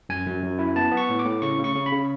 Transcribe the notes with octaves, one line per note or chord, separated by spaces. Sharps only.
F#2 G#5
F#2
F#2
E4
B3 A5
B3
C#6
A2
D6
A2
C#3 C#6
C#3
C#6
C#3
B5
C#3